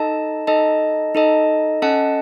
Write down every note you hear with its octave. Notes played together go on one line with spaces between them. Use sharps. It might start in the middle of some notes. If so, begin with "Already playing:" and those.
Already playing: D#4 A4 D#5 A5
D#4 A4 D#5 A5
D#4 A4 D#5 A5
C#4 A4 D#5 F#5 A5